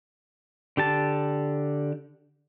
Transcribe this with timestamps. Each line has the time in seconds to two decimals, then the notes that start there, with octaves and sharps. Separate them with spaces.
0.77 D3 G4 A5